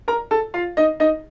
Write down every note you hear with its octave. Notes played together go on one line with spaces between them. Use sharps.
A#4 A#5
A4 A5
F4 F5
D#4 D#5
D#4 D#5